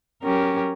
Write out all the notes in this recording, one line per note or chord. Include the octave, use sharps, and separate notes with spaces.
F#3 C#4 G4 A#4